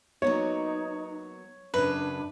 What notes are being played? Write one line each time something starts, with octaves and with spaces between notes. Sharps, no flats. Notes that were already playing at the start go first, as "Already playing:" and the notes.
F#3 A#3 B3 D#4 C#5
F#2 C#3 D4 B4